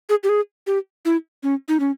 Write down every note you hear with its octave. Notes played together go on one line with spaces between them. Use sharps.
G#4
G4
G#4
G4
E4
C#4
D#4
C#4